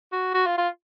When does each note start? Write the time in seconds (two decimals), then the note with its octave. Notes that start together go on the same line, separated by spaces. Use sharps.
0.12 F#4
0.34 F#4
0.46 F4
0.58 F4